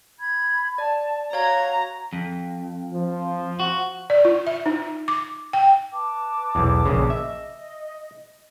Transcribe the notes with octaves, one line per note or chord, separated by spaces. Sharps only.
B5 G#6
D5 A5
F#4 C#5 F5 A#5 G#6
F2
F3
F#4
D5
F4
E5
D#4
D6
G5
B4 A5 D6
B1 E2
A#1 C#3
D#5 E5